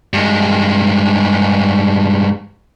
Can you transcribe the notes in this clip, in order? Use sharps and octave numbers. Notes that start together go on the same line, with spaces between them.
G2 G#3